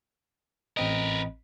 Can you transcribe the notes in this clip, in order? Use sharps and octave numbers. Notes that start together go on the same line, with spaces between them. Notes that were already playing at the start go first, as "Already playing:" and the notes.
A1 C4 A#4 B4 D#5